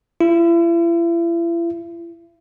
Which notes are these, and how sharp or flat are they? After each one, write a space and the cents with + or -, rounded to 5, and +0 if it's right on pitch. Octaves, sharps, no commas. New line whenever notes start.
E4 +40